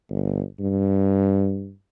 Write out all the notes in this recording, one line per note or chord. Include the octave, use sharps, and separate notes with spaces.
G1
G2